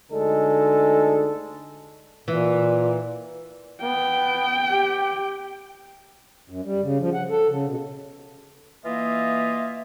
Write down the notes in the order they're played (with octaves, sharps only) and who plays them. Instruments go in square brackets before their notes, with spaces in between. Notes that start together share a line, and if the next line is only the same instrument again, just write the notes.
[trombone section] D2 D3 G#3 D#4 A4
[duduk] A#2 [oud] E3
[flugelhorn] B3 [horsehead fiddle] G5
[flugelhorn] G4
[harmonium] F#2
G3
C#3
F3
F#5
A4
C#3
B2
[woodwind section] E3 A#3 F4 D#5 E5